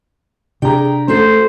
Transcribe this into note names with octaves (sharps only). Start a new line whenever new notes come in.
C3 D4 G4 G#4 G5 A#5
A3 C#4 F#4 A4 C5